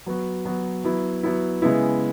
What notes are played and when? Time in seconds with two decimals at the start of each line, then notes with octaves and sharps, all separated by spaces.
0.06 F#3 B3 F#4
0.45 F#3 B3 F#4
0.84 F#3 B3 E4
1.23 F#3 B3 E4
1.62 C#3 G#3 B3 E4